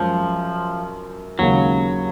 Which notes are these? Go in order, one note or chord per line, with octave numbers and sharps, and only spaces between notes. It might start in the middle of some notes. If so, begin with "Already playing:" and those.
Already playing: F#2 F3 G#3 C#4
D#2 C#3 F#3 G#3